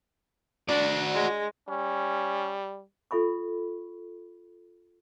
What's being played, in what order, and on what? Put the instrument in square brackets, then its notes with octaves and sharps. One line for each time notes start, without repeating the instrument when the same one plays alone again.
[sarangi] D4 [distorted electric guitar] F#4 D5
[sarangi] G#3
[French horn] G3 [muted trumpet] C#4
[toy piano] F4 A4 E5 B5 C#6